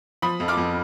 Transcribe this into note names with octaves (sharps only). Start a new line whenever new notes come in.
F3 B5 D#6
F2
D6 F6
F2